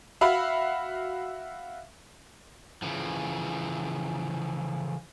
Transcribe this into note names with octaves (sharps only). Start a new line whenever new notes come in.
F#4 E5 F5 B5
C#3 E3 F3